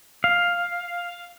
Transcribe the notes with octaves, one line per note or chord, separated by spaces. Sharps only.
F5